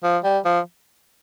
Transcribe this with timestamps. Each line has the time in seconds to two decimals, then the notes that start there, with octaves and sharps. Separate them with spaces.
0.03 F3
0.24 G3
0.45 F3